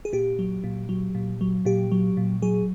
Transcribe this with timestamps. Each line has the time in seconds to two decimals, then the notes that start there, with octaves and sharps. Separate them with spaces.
0.05 G#4
0.13 A#2 G4
0.39 F#3
0.64 A#2
0.89 F#3
1.15 A#2
1.41 F#3
1.65 A#2 G4
1.92 F#3
2.17 A#2
2.42 F#3 G#4